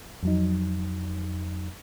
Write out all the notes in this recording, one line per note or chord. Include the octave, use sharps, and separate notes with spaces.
F2 F#3 D#4